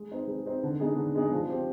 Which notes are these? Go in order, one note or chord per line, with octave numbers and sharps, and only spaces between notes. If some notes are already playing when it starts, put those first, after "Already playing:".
Already playing: G#3
C4 D#4 B4
G#3
C4 D#4 B4
D3
G#3 B3 D#4 G#4
D3
G#3 B3 D#4 G#4
F3
C4 G4